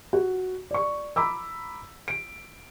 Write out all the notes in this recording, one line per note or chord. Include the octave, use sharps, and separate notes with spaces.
F#4
D5 C#6
A#5 B5 D6 E6
D7